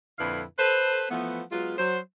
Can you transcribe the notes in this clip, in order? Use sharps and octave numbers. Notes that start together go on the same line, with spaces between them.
F2 A#2 D3 E4 B4 F5
A4 B4 C5
E3 F3 A3 B3
F#3 G#3 B3 F4
F#3 C5